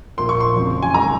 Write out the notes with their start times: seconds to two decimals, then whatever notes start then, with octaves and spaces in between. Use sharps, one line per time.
0.18 A#1 A#2 F3 A#3 C6
0.29 C#6
0.40 C6
0.56 F#1 F2 C#3 F3 C4
0.82 G#5
0.94 D#3 G#3 A#5